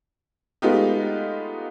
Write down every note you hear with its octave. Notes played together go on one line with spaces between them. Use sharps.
G#3 A3 B3 D#4 F4 G4